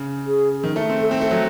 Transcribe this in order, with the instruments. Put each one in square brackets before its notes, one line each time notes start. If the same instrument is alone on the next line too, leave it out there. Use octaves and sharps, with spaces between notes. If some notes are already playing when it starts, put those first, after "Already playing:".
Already playing: [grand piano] C#3
[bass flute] G#4
[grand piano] D#3
A3
C4
[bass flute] A4
[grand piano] C4
[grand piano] A3 [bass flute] A4
[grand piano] F#3